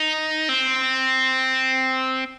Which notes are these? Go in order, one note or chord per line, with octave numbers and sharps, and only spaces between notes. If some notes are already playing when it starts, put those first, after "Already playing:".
Already playing: D#4
C4